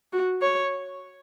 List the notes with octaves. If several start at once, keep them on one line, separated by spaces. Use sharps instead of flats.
F#4
C#5